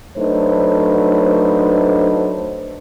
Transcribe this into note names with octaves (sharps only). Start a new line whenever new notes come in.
F#3 A3 D4 D#4 B4 C5